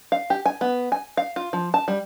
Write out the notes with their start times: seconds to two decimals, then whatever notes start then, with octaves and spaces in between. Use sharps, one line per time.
0.12 F5
0.30 G4
0.46 G#5
0.61 B3
0.92 G#5
1.17 F5
1.36 F4
1.53 F3
1.74 A5
1.88 G3